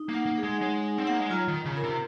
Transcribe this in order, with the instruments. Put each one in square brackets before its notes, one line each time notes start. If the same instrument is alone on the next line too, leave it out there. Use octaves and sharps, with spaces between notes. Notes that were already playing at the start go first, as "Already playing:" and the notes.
Already playing: [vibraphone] D#4
[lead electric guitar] A#3
[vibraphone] F#5
[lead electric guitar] A#3
[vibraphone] G#4
[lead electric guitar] G#3
[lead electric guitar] G#3 [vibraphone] C#5
[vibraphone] D#4
[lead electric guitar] C4
[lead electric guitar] A#3 [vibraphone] F#5
[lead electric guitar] G#3
[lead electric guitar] F#3 [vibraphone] F4
[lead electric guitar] D#3
[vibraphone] F4
[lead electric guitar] C#3
[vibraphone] A#4
[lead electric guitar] C3